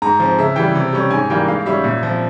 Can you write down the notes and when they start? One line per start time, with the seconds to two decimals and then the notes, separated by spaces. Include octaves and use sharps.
0.02 G#2 A#5
0.20 F3 C4
0.38 C#3 E5
0.56 E3 G3 G5
0.75 C3
0.93 G3 C#4
1.11 G#2 G#5
1.30 E3 G3 A#3 G5
1.48 G#2 F5
1.66 G3 C#4 E5
1.84 A#2
2.03 F3 C4